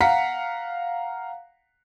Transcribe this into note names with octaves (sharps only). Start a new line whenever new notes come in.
F5 F#5 A#5 B6 C#7